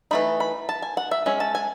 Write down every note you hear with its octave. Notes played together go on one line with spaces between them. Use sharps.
E3 A3 D#4 B5
B5
A5
G#5
F#5
E5
G#3 C#4 E5
A5
G#5